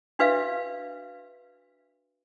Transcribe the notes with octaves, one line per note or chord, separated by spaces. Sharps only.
D4 F#4 B4 E5 F5